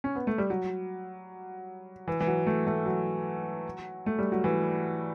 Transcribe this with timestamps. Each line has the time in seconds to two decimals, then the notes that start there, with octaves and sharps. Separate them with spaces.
0.04 C#4
0.15 B3
0.27 A3
0.38 G3
0.50 F#3
2.08 E3
2.21 E3
2.27 F#3
2.47 A3
2.67 A3
2.86 F#3
4.06 A3
4.19 G3
4.32 F#3
4.44 E3